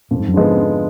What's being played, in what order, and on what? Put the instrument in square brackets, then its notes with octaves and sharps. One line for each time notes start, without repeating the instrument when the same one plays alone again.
[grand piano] F2 [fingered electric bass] A#2
[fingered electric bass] G#2
F#2
[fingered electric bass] G#2 [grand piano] D3 F3 G#3 B3
[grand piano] F2